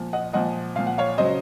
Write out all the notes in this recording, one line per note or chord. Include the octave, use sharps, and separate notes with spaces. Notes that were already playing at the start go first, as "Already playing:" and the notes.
Already playing: A#2 F3
D#5 F#5
A#2 F3 D#5 F#5
A#2 F3 F5
F#5
C#5 F5
C#3 F#3 C5 D#5